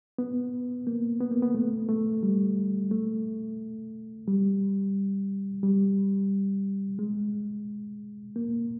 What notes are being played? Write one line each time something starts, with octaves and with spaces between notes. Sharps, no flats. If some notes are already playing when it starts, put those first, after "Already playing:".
B3
A#3
B3
A#3
B3
A3
A3
G3
A3
G3
G3
G#3
A#3